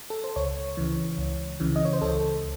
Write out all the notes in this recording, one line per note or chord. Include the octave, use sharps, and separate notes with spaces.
A4
C5
C#2 C#5
C#3 E3
C#2
C#3 E3
D#5
C#5
C5
C#2 A4